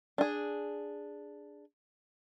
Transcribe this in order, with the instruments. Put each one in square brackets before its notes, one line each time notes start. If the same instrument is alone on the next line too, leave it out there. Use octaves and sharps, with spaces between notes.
[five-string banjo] D4 G#4